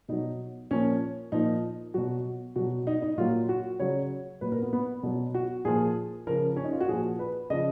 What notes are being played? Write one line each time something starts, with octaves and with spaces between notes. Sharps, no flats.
B2 F#3 D#4
A#2 F3 C#4
A#2 F3 D#4
B2 F#3 F#4
B2 F#3 F#4
D#4
D#4
A#2 F#3 F4
F#4
C#3 F#3 C#5
A#2 F#3 B4
A#4
B3
B3
B2 F#3
F#4
A#2 F3 G#4
C#3 F3 A#4
C#4
D#4
F4
F#4
A#2 F3 G#4
B4
C#3 F3 D#5